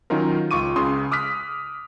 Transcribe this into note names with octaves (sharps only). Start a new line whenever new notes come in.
D#3 F#3 C#4 D#4 F4 A#4
C#2 F4 C#6 D6 D#7
C#2 C#3 C6 D#6
D6 D#6 F6 F#6 B6